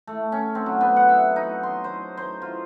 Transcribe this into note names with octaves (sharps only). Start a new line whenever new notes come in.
A3
C#4
C4
F#3
B3
F#5
E5
D#4
C6
C5
C5
F4